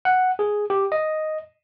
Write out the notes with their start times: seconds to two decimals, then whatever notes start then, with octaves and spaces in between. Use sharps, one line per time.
0.05 F#5
0.39 G#4
0.70 G4
0.92 D#5